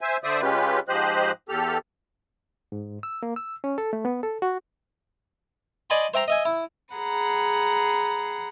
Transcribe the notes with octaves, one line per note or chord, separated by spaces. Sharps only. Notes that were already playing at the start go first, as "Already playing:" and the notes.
C5 E5 G#5
D3 C5 D5 E5 D#6
C#3 G#3 C#4 F4 G4 B4
G#2 F3 G4 C5 D#5 F#6
E2 G4 A4 F6
G#2
E6
A#3
E6
C#4
A4
A3
B3
A4
F#4
D5 D#5 G#5 A5 B5 C6
C5 E5 G5 A#5 C6
D#5 E5 G#5
E4
G#4 F#5 A#5 B5